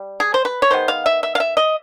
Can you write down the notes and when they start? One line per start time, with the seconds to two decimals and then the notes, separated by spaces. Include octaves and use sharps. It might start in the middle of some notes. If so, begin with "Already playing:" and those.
Already playing: G3
0.20 G#4
0.34 C5
0.45 B4
0.62 C#5
0.71 D#3 G#3 B3 C5
0.88 F5
1.06 E5
1.23 E5
1.35 F5
1.40 E5
1.57 D#5